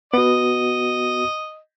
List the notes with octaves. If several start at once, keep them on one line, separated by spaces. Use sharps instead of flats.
B3 F#4 D#5